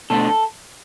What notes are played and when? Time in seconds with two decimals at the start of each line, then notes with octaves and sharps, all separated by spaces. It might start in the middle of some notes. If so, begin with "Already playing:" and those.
0.10 B2 A3 D4 A4